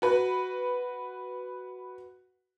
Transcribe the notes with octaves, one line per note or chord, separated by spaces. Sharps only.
F#4 B4